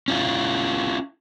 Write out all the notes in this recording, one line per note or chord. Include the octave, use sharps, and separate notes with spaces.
C#4 E4 F4